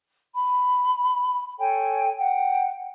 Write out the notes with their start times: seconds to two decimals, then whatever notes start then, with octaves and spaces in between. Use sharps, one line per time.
0.33 B5
1.59 A4 C#5 G5 G#5
2.18 F#5 G5